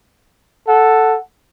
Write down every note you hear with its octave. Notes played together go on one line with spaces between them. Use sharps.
A4 F#5